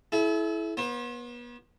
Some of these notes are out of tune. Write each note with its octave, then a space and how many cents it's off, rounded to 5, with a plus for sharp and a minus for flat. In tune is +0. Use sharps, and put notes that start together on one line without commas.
E4 +0 A4 -45
B3 -35 C5 +35